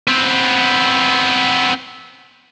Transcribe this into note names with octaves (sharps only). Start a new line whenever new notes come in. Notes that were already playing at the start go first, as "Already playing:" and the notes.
B3 C4